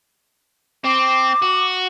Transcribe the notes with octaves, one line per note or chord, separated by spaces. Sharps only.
C4 D6
F#4